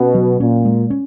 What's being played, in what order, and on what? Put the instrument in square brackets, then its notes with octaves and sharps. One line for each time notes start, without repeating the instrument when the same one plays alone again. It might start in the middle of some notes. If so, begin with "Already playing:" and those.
Already playing: [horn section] B2 [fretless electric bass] C#4
[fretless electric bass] F#3
[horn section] A#2 [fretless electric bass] C#4
[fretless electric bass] G#3
C#4